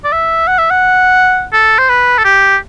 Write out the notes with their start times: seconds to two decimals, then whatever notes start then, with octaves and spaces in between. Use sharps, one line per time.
0.04 D5
0.12 E5
0.47 F#5
0.58 E5
0.71 F#5
1.53 A4
1.79 C5
1.89 B4
2.19 A4
2.25 G4